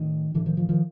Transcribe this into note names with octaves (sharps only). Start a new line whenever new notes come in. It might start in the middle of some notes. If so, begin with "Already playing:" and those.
Already playing: A2 D#3
A2 D3 E3
D#3 F3
D#3 F3
D#3 F3